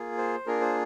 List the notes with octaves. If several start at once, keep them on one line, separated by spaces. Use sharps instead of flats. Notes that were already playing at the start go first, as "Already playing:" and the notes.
Already playing: A#3 F4 G#4
C5
A#3 D4 F4 G#4 A#4
C5